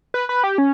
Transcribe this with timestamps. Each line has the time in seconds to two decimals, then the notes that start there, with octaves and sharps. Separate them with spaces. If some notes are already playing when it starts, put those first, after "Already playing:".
0.14 B4
0.29 B4
0.44 G4
0.58 C#4